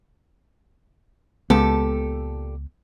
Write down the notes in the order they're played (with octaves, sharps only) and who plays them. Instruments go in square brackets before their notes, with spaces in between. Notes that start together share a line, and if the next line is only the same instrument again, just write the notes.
[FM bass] C#2 [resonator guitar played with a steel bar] A#2 G4 A4 [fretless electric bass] G#3 B3